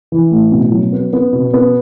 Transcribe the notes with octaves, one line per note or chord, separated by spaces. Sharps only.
E3
A2
B2
F#3
B3
B3
B2
B3